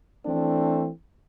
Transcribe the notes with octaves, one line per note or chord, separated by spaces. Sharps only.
E3 A3 C4 D4